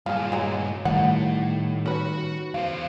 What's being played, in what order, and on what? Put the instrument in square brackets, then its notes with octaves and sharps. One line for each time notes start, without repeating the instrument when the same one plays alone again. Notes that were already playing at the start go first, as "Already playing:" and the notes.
[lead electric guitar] G2 A#2 [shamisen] F4 G#4
[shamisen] F#3 G#3 D#4
[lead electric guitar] A2 [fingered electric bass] D#3 G3 [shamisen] F#5
[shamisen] C#4 B4 [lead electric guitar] F#4
[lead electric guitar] E2 C5 [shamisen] F5